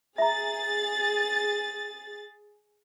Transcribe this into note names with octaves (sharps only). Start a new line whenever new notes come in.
G#4 E5 A#5 A6